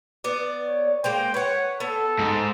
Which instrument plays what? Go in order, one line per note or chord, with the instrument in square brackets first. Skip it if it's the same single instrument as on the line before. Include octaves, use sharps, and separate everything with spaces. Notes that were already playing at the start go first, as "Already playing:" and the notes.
[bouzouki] B3 D5
[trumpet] C#5
[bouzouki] G#3 A#3 C5 [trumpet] G5
[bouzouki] B4 F#5 [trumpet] C#5
[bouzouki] B3 [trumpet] A4
[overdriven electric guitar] G#2